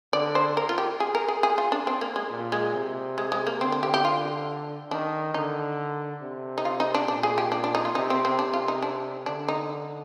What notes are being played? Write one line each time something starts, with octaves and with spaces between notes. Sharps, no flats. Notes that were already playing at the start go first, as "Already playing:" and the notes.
D3 D5
C5
A#4
F4
G4
G#4
A#4
G#4
G#4
F4
D4
C4
A#3
G#3
A#2
G#3
C3
G#3
G#3
A#3
D3 C4
C4
G4
G4
F4
D#3 D4
D3 D#4
C3
D#4
F4
D#4
D4
A#2 D4
G#4
G4
D4
D4
D#4
F4
C3 D#4
C4
C4
C3 D4
F4
D#4
D4
D3 D4
D#4